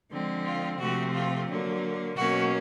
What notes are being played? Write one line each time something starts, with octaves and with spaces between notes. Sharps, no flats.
D3 F3 G#3 C4
F4
C3 F3 A3 C4 F#4
F4
D3 F#3 A#3
B2 F#3 A#3 C#4 F#4